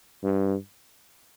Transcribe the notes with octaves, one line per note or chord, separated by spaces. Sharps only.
G2